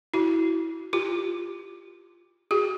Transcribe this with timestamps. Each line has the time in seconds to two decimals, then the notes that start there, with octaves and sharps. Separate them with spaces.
0.14 E4 F#4
0.93 F4 G4
2.51 F#4 G#4